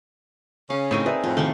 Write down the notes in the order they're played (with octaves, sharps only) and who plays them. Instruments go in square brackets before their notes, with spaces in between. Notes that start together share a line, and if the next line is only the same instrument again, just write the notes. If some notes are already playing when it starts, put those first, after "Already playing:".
[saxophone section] C#3 C#4 [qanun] F5
[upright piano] A2 C#6 D#7 [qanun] C4 D#4 A#4
[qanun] G#4 [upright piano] B4 D5 E5
[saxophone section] F2 A2 [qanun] F4
[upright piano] C3 D#3 G5 [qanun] A3 C6 C#6